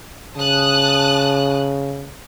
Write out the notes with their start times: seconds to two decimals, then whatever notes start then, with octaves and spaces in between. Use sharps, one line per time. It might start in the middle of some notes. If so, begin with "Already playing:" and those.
0.37 C#3 A5 D#6 F#6